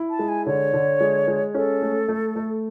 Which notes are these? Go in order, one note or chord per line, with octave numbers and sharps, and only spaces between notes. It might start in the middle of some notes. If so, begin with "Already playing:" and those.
Already playing: E4
A5
G#3
G#5
D3 C#5
D3
G#3
G#3
C#4 A4
A3
A3
A3